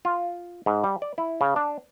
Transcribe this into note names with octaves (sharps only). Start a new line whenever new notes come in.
F4
G#2
G3
D5
E4
C#3
D4